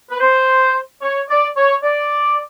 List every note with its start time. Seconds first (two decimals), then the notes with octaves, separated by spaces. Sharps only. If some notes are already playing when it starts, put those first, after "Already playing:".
0.10 B4
0.20 C5
1.02 C#5
1.29 D5
1.56 C#5
1.83 D5